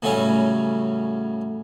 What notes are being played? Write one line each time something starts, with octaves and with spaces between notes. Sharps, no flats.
A2 C#3 F#3 G3 C#4